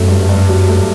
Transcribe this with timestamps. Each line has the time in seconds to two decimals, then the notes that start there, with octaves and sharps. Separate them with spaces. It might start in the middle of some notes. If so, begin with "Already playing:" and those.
Already playing: F#2 F#3 A3
0.08 G2
0.29 G2
0.49 F#3
0.68 A3